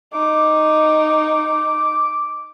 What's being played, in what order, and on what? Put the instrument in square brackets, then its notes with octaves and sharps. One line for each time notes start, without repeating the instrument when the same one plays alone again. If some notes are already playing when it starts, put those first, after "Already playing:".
[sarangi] D#4 [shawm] D6